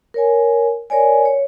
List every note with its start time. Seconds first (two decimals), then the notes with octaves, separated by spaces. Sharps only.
0.14 A#4 C#5 G#5
0.90 A#4 C#5 D5 G#5
1.25 C#5